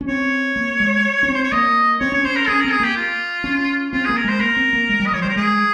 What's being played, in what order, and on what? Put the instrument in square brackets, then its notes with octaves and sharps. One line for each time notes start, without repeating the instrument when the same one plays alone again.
[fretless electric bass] C#4
[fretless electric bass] C4 [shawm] C#5
[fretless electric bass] A#3
G#3
C#4
C4
[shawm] C5
C#5
[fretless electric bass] A#3 [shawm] D#5
[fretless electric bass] C4 [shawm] C#5
[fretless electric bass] C#4 [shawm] C#5
[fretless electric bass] C#4 [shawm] C5
[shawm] A#4
[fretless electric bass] C#4 [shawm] G#4
[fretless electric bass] C4 [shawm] A#4
[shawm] G#4
[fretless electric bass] A#3 [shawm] G4
[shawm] F4
[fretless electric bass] C#4
[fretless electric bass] C4 [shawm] F4
[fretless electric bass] A#3 [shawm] G#4
[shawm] A#4
[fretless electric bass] G#3 [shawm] C5
[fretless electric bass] A#3 [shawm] A#4
[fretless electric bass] C4
A#3
G#3
G3
[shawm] D#5
[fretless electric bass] F3 [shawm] C#5
[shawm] C5
[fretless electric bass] G3 [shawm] A#4
[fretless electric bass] G#3 [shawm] G#4